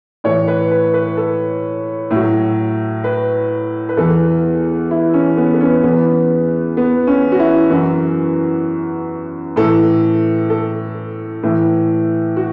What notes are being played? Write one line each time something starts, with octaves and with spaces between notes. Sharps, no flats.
A2 E3 C#5
B4
B4
B4
A4
A2 F#3
B4
B4
E2 E3 A4
E4
C#4
B3
B3
C#4
E2 E3 B3
B3
C#4
F#4
E4
F#2 E3 F#4
A2 E3 A4
A4
A2 E3
F#4